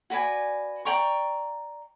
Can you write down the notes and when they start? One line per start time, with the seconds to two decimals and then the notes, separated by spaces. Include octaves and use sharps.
0.10 F#4 B4 D5 G#5
0.85 D5 G5 A#5 C#6